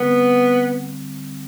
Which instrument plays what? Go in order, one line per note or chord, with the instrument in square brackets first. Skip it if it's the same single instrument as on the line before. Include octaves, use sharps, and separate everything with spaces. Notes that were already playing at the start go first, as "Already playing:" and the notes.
Already playing: [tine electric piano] D3 G3 C4 [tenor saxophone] B3